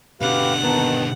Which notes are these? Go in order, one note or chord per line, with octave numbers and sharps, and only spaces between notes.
B2 D3 G4 B4 F5 F#5
D#2 D#3 B3 D#4 A5